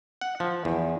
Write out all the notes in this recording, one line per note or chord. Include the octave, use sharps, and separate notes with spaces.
F#5
F3
E2